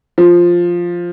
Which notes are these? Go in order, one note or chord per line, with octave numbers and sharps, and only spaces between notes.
F3